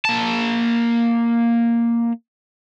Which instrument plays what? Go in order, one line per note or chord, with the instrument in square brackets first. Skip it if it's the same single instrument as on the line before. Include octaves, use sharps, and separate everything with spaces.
[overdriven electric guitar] A#3 A5